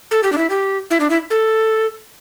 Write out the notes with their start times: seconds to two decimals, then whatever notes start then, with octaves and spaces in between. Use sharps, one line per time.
0.11 A4
0.23 G4
0.32 D4
0.38 E4
0.50 G4
0.90 E4
1.00 D4
1.10 E4
1.30 A4